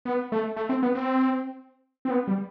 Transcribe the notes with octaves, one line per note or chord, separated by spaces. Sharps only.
B3
A3
A3
C4
B3
C4
C4
B3
G3